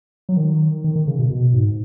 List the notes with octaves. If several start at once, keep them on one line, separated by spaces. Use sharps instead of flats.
F#3
D#3
D#3
D#3
C#3
B2
B2
G#2